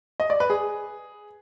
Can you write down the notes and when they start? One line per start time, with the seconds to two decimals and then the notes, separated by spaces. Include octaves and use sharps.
0.20 D#5
0.30 D5
0.40 B4
0.50 G#4